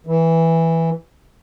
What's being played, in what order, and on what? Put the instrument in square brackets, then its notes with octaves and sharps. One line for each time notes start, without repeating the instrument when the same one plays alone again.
[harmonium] E3